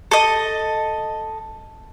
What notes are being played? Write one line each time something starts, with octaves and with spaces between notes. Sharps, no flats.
A4 D#5